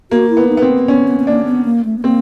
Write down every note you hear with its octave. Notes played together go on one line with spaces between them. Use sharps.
A#3 F#4
E4
B3
D#4
B3
C4
B3 C#4
B3
B3
A#3 D4
B3
A#3
A3
B3
A#3 C4